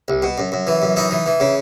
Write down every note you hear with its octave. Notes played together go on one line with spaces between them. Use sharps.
C2
B2
F#2
F#2
E3
F#2
E3 D#4
E3
E3
C#3